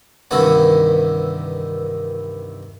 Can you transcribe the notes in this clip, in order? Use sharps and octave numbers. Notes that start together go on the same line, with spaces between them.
C2 G2 D#3 E3 E4 F#5